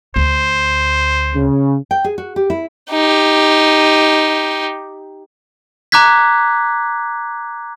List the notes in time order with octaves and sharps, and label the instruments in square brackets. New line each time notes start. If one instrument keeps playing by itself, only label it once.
[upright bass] D2 [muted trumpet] C5
[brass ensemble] C#3
[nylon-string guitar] G5
G#4
F#4
G4
E4
[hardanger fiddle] D#4 G4
[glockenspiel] A#5 D6 F#6 G#6 B6